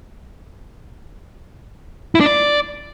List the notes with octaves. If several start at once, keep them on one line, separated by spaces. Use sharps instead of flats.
E4
D4
D5